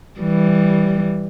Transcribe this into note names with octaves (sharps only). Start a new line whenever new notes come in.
E3 G3